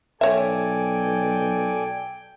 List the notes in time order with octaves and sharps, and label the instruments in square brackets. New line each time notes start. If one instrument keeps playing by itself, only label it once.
[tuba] B1 [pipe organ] A4 D5 G#5 [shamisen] C#5 E5 [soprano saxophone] G5